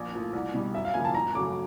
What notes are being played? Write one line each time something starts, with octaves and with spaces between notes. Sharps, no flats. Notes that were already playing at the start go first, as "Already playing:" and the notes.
Already playing: A#1
A2 F3 A#3
C2
B2 G3
F#2 E5
F5
C#3 F3 A#3 G#5
A5
G#1 A#5
F#2 C#3 F#3 A3 D6